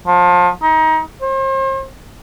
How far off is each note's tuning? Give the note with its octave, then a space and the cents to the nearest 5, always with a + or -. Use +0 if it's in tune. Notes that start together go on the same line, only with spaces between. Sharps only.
F3 +30
D#4 +25
C5 +40